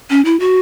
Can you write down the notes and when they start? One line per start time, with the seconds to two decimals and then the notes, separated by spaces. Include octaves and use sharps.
0.10 C#4
0.25 E4
0.40 F#4